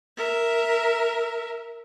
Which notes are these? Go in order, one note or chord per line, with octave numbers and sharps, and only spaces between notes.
A#4 E5